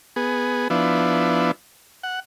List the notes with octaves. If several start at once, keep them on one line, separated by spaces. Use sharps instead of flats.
B3 G#4
F3 B3 D4 E4
F#5